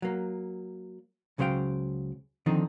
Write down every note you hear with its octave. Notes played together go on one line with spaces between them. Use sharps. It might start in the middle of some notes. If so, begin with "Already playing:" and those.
F#3 A#3
C#2 C#3 F#3 C5 F5 G5
D3 D#3 F3 C4 D#4